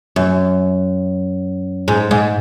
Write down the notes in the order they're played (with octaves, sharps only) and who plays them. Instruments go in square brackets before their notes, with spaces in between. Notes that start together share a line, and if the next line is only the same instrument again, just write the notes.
[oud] F#2
G#2
G#2